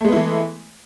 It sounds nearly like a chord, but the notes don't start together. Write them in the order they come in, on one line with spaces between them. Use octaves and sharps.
A3 G#3 B3 E4 E3